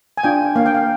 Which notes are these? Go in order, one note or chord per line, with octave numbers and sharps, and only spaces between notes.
G#5
D4 F4 G5
A#3 F5
G5
F5